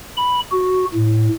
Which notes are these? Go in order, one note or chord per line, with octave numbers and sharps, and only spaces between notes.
B5
F#4
A2